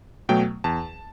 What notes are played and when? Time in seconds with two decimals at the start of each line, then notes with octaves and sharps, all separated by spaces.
0.29 B2 F#3 A3 G5
0.64 E2 A5